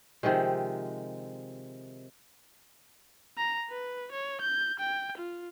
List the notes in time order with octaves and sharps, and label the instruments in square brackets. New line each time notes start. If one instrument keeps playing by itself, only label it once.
[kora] C3 D#3 F3 G#3
[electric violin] A#5
B4
C#5
G6
G5
F4